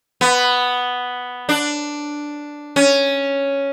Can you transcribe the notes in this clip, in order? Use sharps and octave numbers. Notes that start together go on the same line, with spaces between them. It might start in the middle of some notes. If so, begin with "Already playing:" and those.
B3
D4
C#4